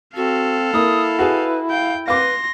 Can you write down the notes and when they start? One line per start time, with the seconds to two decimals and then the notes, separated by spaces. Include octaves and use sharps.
0.16 C4 F#4 A4 F5
0.74 A#3 E4 D#6
1.19 F#4 G#4 B4
1.70 F5 G5
2.08 B4 F5 C6 D6 A#6